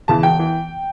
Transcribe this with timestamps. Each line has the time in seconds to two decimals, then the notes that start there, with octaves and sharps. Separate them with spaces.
0.08 E2 C#3 E3 A5
0.23 E1 G5
0.39 E3